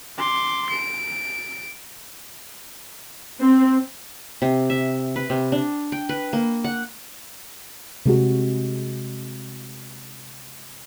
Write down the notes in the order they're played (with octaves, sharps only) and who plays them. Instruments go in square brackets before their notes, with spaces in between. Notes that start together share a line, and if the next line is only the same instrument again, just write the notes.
[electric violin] C6 D6
D7
[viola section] C4
[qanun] C3
E5
B4
C3
D4
G5
B4
A#3
F#5
[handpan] C3 G#3 F#4